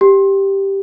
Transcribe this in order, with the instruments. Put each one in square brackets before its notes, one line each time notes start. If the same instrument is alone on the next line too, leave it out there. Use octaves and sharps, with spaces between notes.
[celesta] G4